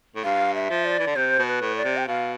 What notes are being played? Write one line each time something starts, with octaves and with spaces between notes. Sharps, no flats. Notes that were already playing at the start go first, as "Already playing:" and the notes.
A2
G2 F5
E5
F3
D5
E3
D3
C3 C5
B2
B4
A2
D5
C3
G5
B2 F5